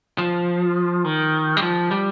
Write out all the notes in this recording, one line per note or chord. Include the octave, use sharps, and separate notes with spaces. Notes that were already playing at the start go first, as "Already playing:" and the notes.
F3
D#3
G3
F3
G3